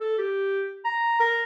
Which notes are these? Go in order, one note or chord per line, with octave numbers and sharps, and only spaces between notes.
A4
G4
A#5
A#4